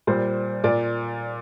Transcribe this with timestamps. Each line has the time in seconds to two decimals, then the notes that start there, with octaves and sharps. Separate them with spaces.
0.07 A#2 G3 C5
0.64 A#2 D5